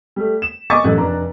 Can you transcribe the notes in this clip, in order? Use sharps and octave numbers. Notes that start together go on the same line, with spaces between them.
G3 A3
E7
D#5 G#5 C#6 D6 A6
A1 F#2 A3 F#6
F1 D4 A#5